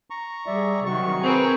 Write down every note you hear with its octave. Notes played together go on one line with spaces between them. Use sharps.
A#5 C#6
G3 G#4 D5 E5
C3 D#3 F#3 F#4 C#6
C4 G#4 A#4 B4